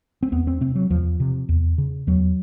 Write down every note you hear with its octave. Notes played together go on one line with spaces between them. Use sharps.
C4
E2 B3
C4
C3 C4
F#3
E2 F3
C3
E2
C#3
E2 F#3